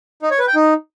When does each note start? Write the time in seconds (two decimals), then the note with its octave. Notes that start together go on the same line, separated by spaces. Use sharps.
0.23 D#4
0.31 C#5
0.39 B4
0.47 G5
0.56 D#4